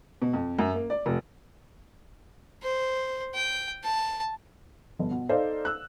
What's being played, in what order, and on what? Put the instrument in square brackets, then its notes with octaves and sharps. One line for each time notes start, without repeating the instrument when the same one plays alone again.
[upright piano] B2
F2
F#2
A#3
D5
F1
[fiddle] C5
G5
A5
[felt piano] G1
B2
D#4 A4 C5 D5 F5
E6 F#6